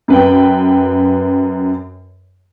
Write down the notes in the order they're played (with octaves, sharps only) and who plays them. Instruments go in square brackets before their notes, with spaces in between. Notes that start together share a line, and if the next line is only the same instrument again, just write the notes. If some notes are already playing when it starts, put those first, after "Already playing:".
[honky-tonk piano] F#2 B4 G5